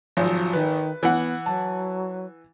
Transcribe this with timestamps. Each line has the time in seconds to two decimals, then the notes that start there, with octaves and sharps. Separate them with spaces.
0.17 G#1 F3 F#3
0.53 D#3 B4
1.03 E3 B3 F#5
1.46 F#3 A5